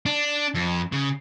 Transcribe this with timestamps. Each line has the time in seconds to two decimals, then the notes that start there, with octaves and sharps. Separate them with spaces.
0.06 D4
0.54 F2
0.93 C#3